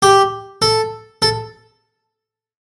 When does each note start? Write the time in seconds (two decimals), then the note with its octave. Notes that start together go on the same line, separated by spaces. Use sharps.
0.02 G4
0.62 A4
1.22 A4